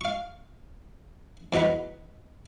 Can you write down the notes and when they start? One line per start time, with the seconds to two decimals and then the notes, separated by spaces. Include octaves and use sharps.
0.01 F5 C#6
1.53 E2 F#3 D#4 F#5 B5